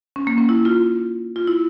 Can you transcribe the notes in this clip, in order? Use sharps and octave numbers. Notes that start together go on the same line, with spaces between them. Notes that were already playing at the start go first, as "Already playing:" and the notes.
C#4
A#3
C#4
E4
F4
F4
E4